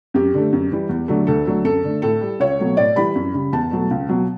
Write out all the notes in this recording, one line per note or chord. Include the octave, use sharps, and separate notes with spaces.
F#2 G4
D3 A3
F#2
E3 G3
E2
D3 F#3 A3
D2 A4
D3 F#3 A3
F#2 A4
D3 A3
A2 A4
G3
C#2 C#5
B2 F#3 A3
A2 D5
E3 G3 B5
F#2
C#3 G3
E2 A5
B2 F#3 A3
C#2
B2 F#3